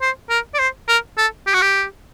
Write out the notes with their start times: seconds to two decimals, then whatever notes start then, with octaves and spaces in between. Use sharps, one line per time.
0.01 C5
0.30 A#4
0.54 D5
0.59 C5
0.89 A#4
1.18 A4
1.47 G4
1.54 F#4
1.62 G4